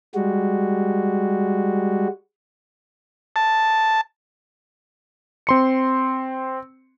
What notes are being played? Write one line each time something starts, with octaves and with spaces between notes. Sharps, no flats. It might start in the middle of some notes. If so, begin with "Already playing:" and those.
G3 G#3 F#4
A5
C4 C6 C#7